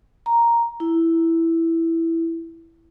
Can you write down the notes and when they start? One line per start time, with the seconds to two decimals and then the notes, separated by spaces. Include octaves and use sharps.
0.26 A#5
0.80 E4